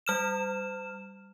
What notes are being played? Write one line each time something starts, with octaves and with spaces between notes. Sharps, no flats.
G3 F6 E7